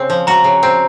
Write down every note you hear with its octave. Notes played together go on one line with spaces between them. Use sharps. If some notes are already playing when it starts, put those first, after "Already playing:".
Already playing: C#3 C4
F3
F#4 A#5
C#3
C4